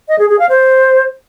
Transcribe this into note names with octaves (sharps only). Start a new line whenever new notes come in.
D#5
G#4
G#4
F5
C5